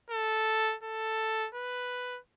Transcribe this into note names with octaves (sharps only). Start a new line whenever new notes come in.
A4
A4
B4